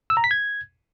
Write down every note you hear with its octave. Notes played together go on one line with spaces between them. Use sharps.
E6
A#5
B6
G#6